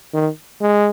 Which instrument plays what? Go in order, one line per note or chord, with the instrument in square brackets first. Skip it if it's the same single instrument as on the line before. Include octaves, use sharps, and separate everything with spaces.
[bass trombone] D#3
G#3